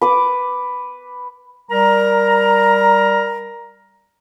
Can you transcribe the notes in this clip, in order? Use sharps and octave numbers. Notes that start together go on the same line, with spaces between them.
B4 D6
G3 A#4 A#5